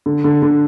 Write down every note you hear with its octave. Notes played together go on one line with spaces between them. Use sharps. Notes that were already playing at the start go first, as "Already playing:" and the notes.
D3
D3
D3